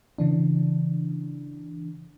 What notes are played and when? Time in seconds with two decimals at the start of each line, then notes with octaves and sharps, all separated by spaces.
0.18 C#3 E3 D4